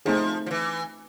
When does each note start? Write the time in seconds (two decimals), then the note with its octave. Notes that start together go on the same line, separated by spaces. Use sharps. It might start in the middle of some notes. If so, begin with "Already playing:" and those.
0.06 F3 A3 C4 D#4 G#4
0.46 F3
0.51 E3